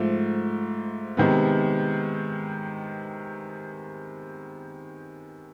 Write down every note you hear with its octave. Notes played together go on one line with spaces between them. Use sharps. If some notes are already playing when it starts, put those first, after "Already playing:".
Already playing: G#2 F3 A3
C3 D#3 G#3 B3